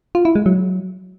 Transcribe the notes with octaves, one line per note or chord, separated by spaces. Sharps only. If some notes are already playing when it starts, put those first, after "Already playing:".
F4
E4
G#3
F#3